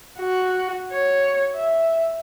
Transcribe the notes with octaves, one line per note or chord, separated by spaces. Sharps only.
F#4
C#5
E5